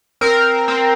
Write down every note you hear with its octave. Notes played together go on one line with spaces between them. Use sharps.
C4 A#4
C4